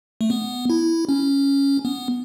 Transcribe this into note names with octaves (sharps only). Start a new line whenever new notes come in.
A3
B3
E4
C#4
B3